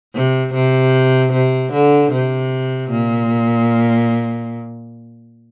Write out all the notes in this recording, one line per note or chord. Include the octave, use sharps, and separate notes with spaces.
C3
C3
C3
D3
C3
A#2